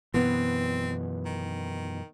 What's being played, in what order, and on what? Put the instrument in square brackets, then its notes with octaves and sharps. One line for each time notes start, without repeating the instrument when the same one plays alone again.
[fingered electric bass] F#2 B2 E3 [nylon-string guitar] B3 [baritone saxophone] C4
[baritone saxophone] D#3